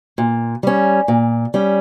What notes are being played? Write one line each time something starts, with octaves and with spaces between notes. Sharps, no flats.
A#2
G3 C#4
A#2
G3 C#4